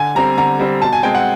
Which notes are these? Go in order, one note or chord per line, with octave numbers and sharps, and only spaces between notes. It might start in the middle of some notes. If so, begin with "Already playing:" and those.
Already playing: D3 G#5
G3 C4 A#5
D3 A#5
G3 C4
B2 A5
G#5
G#3 C4 G5
F#5